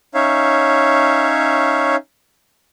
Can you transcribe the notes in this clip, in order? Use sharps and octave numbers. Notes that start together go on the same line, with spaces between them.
C#4 D#4 C#5 E5 F5